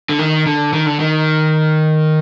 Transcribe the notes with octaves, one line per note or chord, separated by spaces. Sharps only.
D3
D#3
D3
D#3
D3
D#3